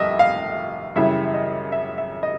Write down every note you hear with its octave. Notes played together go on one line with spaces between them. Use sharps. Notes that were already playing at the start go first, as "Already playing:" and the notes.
Already playing: F1 D#2 G3 D#5 E5
F5
F#2 C#3 E3 G3 E5
D#5
E5
E5
D#5